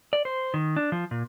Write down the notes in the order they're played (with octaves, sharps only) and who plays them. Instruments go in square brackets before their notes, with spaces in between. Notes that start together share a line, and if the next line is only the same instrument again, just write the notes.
[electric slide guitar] D5
C5
D#3
D4
F3
A#2